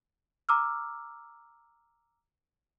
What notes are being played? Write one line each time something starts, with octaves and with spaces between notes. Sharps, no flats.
A#5 D6 E6 F6